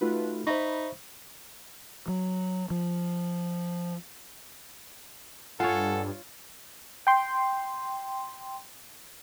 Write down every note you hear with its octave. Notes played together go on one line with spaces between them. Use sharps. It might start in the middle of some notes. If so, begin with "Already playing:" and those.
A3 D#4 F4 F#4 B4
D#4 C5 E5 B5 C#6
F#3
F3
G2 F4 A4 C#5 F#5 G#5
G5 C6